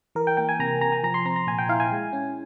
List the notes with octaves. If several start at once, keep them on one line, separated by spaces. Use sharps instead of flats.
E3 A#4
G5
A#3 G5
G#5
C3 A#5
C3 A#5
G#5
F3 A#5
C6
C4 A#5
A#5
A#2 G#5
G5
E4 F5
G#5
G#3
C#4